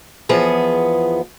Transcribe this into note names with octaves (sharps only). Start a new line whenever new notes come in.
E2 F3 B3 G#4